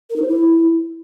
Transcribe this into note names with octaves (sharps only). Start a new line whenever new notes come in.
A#4
D#4
C5
E4